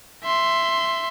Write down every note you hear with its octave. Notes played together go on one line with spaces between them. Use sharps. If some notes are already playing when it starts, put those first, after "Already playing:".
E5 C6